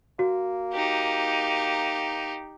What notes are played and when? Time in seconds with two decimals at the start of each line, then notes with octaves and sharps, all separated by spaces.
0.19 A#3 F#4
0.74 D#4 G4